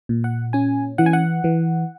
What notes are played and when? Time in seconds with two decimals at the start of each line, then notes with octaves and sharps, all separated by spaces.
0.09 A#2
0.24 F#5
0.53 C#4 G#5
0.98 E3 F#5
1.06 G#5
1.13 F#5
1.44 E3